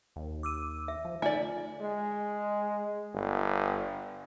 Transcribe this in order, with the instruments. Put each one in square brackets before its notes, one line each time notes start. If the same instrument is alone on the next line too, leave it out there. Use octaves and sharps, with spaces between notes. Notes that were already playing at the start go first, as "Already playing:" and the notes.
[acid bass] D#2
[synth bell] D6 E6 D#7
[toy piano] E5
[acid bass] F3
[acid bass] D3 [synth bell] A3 D#4 F4 [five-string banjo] D5 E5 [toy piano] G#5
[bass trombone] G#3
G1